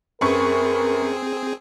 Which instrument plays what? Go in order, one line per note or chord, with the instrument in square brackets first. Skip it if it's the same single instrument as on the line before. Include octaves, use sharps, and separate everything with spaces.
[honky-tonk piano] F#2 B4 C#6 [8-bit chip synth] C4 G#4 [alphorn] A#4